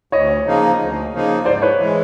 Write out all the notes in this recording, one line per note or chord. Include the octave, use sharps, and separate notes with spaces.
D2 C#5 D#5
C#3 F3 A#3 D#4
D2
C#3 F3 A#3 D#4
G#2 C5 D5
B4 C#5
E3 G#3